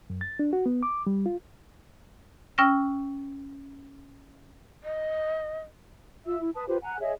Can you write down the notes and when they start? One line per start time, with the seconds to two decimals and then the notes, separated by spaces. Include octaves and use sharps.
0.10 F#2
0.21 A6
0.39 D4
0.53 F#4
0.66 B3
0.83 D6
1.07 G3
1.26 F4
2.58 C#4 G5 E6 F6 A#6
4.84 D#5
6.26 F4 E5 E6
6.39 E4
6.55 B4 A5 D#6
6.67 F4 G4 B4 C5
6.82 F#5 G#5 A#5 F#6
7.01 G#4 C#5 D#5 E5